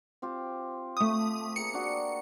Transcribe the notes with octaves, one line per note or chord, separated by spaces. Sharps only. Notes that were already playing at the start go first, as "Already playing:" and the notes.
C4 F4 G4
A3 D#6
A#3 G#4 A#4 C#7
D4 F#4 G4